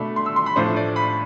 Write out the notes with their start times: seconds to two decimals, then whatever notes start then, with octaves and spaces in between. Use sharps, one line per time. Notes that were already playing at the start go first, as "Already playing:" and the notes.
Already playing: B2 A3 D4 B5
0.16 C6
0.26 E6
0.36 C6
0.46 B5
0.56 A2 F3 A3 D4 C5
0.76 D5
0.96 B5